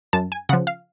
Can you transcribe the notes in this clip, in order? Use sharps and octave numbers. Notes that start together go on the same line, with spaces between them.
F#2 A5
G#5
C#3 F3 F#5
F5